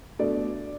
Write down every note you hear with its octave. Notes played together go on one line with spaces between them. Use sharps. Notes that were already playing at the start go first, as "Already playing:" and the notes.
B2 A3 D4 D5